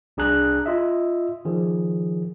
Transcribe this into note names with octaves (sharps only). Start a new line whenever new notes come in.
C2 D4 G#4 A#5 F#6
F4 D#5 E5
D#3 F3 G#4